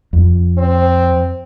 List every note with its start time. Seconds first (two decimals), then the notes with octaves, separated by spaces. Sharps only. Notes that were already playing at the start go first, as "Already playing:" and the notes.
0.13 F2
0.58 C4